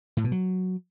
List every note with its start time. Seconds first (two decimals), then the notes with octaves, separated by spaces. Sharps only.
0.17 A2
0.24 B2
0.32 F#3